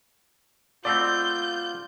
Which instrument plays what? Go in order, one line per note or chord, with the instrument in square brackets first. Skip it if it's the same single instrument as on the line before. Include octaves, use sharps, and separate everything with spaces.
[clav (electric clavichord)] B2 A3 C4 [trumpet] F4 [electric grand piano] D5 [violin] G6